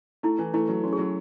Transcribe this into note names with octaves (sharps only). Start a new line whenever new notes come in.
A3 E4
E3
A3 E4
F#3
C#4 F#4
G#4
F#3 F#4